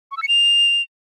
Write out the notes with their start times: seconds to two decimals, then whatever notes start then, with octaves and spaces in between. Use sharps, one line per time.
0.11 C#6
0.17 E6
0.23 C#7
0.28 F7